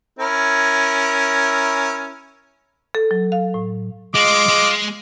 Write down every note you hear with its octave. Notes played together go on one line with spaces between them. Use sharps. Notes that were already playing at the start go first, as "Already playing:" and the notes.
C#4 E4 A#4
A4
F#3
F5
A2
G#3 F4 D#5 D6
G#3